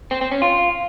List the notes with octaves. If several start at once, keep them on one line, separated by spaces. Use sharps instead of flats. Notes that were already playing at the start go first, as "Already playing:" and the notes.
C4
C4
C#4
F4